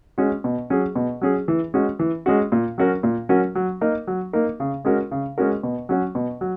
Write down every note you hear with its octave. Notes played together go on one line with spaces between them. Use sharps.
G#3 C#4 F#4
B2
F#3 C#4 G#4
B2
F#3 C#4 G#4
E3
G#3 C#4 F#4
E3
G#3 C#4 F#4
A#2
F#3 C#4 F#4 A#4
A#2
F#3 C#4 F#4 A#4
F#3
A#3 D#4 A#4
F#3
A#3 D#4 A#4
C#3
G#3 C#4 F#4 A#4
C#3
G#3 C#4 F#4 A#4
B2
F#3 C#4 F#4
B2
F#3